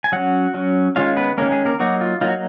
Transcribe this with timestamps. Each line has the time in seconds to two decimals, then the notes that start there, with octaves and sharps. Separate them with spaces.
0.04 G#5
0.12 F#3 C#4 F#4 F#5
0.54 F#3 C#4
0.96 D#3 G#3 C#4 F4 F5
1.17 B3 B4
1.38 D#3 G#3 A#3 C#4 A#4
1.51 G#3 G#4
1.65 A#3 A#4
1.79 F#3 A#3 D#4 F#4
2.01 F4
2.21 F#3 A#3 D#4 F4
2.28 F#4